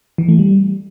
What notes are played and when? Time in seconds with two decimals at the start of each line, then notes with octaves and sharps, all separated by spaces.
0.18 E3
0.28 A3
0.39 G3